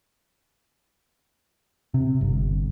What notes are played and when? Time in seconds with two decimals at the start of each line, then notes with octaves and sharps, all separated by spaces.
1.94 C3
2.21 G1